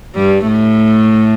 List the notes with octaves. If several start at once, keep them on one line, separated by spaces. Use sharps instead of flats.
G2 G3
A2 A3